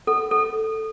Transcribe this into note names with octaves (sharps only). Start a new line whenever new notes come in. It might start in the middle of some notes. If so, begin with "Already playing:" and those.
A4
A4